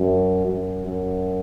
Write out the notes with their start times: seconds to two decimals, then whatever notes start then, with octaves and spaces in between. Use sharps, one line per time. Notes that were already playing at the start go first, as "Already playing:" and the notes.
Already playing: F#2
0.48 F#2
0.86 F#2